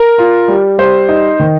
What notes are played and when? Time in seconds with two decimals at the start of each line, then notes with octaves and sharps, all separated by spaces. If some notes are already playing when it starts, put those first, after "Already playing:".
Already playing: A#4
0.18 F4
0.48 G3
0.78 G3 C5
1.09 D#4
1.40 D#3